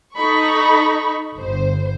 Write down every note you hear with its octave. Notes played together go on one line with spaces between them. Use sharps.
D#4 A4 B5 C#6
G1 C5